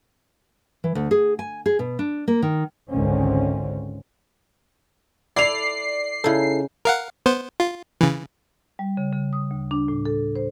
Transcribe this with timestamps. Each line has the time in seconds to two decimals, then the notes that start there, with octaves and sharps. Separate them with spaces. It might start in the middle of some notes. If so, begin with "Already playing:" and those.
0.84 E3
0.95 D2
1.11 G#4
1.39 G#5
1.66 G#4
1.79 B2
1.99 D4
2.28 A#3
2.42 D#3
2.90 G#1 C#2 G#2 D3 C4 C#4
5.36 E4 A4 D5 C7 F7
6.24 C#3 D#4 E4 A4
6.85 A#4 F5 F#5
7.26 B3 C5
7.60 F4
8.01 C#3 E3
8.79 G3
8.97 C#3
9.13 C#3
9.33 D#6
9.51 D2
9.71 D4
9.88 A2
10.06 A4
10.36 C5